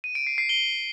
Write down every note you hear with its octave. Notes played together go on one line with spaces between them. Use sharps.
D#7
D7
C7
C7
G7